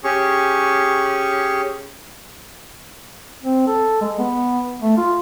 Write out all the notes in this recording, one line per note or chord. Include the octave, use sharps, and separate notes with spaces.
C#4 G4 G#4 C#6
C4
A4
G#3
B3
A3
F4